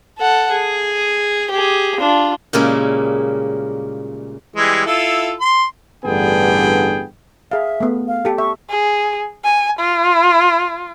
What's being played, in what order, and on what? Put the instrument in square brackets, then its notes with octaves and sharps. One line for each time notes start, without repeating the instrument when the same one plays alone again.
[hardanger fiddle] A4 F#5
G#4
G4 G#4
D4 F4
[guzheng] A#2 C#3 G3 G#3 A#3 E4
[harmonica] E3 G3 G#3
E4 F4 A4
C6
[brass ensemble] A1 G2 D3 B3 G#4 G5
[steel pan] G#4 F5 [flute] E5
[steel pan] A3 B3
[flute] F5
[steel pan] G4 A4
[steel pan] E5 [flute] C#6
[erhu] G#4
G#5
F4